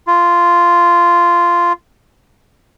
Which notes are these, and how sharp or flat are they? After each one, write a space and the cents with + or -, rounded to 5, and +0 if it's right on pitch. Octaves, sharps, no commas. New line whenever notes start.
F4 -10